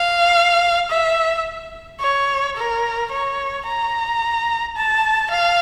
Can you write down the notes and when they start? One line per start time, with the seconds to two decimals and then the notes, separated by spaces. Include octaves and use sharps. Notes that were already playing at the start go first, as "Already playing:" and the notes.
Already playing: F5
0.90 E5
2.00 C#5
2.56 A#4
3.11 C#5
3.66 A#5
4.76 A5
5.31 F5